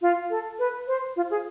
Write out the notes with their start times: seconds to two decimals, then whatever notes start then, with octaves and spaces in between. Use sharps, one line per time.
0.02 F4
0.30 A4
0.59 B4
0.87 C5
1.16 F4
1.31 G#4